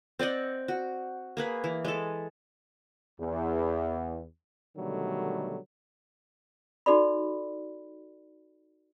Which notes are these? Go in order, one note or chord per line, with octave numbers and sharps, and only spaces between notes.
C4 D5 D#5 F#5
F#4
A#3 G#4 B4
E3
G#3 A4
E2
B2 D3 D#3 F#3 G3 A3
D#4 F#4 A4 D5 B5